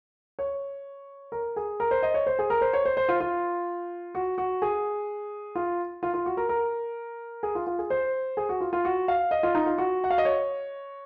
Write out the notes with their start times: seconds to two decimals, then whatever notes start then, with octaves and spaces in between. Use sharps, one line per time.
0.39 C#5
1.32 A#4
1.56 G#4
1.80 A#4
1.91 C5
2.03 D#5
2.14 C#5
2.26 C5
2.39 G#4
2.50 A#4
2.61 C5
2.73 C#5
2.85 C5
2.97 C5
3.09 F4
3.20 F4
4.15 F#4
4.38 F#4
4.62 G#4
5.55 F4
6.03 F4
6.14 F4
6.26 F#4
6.37 A#4
6.49 A#4
7.43 G#4
7.55 F4
7.67 F4
7.79 G#4
7.90 C5
8.37 G#4
8.49 F#4
8.61 F4
8.73 F4
8.85 F#4
9.08 F5
9.31 D#5
9.43 F4
9.55 D#4
9.66 F4
9.78 F#4
10.04 F#5
10.10 F5
10.18 D#5
10.25 C#5